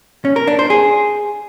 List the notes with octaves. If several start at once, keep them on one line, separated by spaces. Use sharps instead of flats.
C#4
A#4
D4
C5
G#4